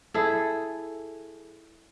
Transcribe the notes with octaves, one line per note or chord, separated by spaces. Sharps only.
E4 G#4 A4